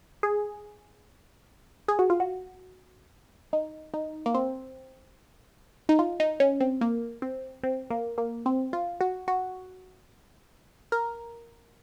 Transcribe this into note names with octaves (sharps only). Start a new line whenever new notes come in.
G#4
G#4
F#4
F4
F#4
D#4
D#4
A#3
C4
D#4
F4
D#4
C#4
C4
A#3
C4
C4
A#3
A#3
C4
F4
F#4
F#4
A#4